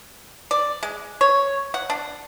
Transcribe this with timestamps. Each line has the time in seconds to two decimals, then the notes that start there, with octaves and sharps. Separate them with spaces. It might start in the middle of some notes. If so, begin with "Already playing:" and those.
0.51 D5
0.83 G#3
1.21 C#5
1.74 F#5
1.90 D4